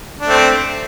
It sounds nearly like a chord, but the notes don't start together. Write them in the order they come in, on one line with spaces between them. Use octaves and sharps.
D4 A3 C4